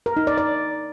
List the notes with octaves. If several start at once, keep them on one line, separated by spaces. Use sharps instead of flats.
A#4
D#4
D5
D5